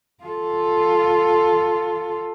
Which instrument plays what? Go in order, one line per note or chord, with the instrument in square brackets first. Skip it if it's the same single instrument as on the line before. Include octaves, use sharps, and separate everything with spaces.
[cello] F4 A4